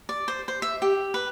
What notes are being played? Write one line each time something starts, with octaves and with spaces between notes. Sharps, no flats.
D5
C5
C5
E5
G4
B4